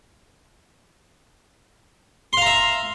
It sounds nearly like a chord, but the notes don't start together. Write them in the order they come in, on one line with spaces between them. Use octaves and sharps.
C6 F5 A#5 E5